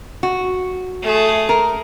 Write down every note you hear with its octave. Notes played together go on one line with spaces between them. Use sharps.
F#4
A3 G#4
A#4